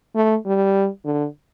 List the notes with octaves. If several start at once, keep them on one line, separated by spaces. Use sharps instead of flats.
A3
G3
D3